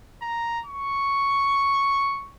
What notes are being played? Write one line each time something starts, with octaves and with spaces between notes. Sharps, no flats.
A#5
C#6